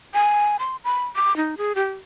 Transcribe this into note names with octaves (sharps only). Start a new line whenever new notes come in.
G#5
C6
B5
D6
D#4
G#4
G4